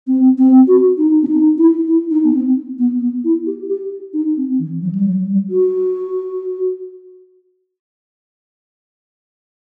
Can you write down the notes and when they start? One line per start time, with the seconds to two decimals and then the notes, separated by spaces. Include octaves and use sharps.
0.07 C4
0.38 C4
0.68 F#4
0.98 D#4
1.23 C4
1.27 D#4
1.58 E4
1.88 E4
2.11 D#4
2.24 B3
2.33 C4
2.79 B3
3.01 B3
3.24 E4
3.47 G4
3.69 G4
4.13 D#4
4.37 C4
4.59 E3
4.82 F#3
4.95 G3
5.04 F#3
5.26 G3
5.50 F#4